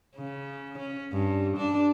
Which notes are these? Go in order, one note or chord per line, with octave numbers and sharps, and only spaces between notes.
C#3
C#4
G2
D4